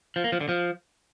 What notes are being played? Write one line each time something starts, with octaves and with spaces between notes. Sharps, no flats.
F3
A#3
F3
D3
F3